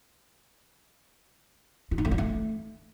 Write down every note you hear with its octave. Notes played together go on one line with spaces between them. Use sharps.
F4
D#4
A3
G3
A3